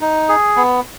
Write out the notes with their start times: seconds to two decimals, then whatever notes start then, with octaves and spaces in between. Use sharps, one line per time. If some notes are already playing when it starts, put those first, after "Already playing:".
0.01 D#4
0.29 G#4
0.56 B3